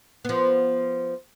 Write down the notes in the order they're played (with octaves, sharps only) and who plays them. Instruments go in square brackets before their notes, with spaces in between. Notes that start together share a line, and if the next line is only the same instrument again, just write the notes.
[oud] F3 B3